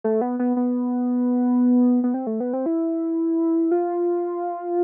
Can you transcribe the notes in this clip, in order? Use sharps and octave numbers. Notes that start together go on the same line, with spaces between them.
A3
B3
B3
B3
B3
C4
A3
B3
C4
E4
F4